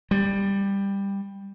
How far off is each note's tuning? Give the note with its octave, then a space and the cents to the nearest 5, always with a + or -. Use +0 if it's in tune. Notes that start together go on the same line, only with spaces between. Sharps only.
G3 +10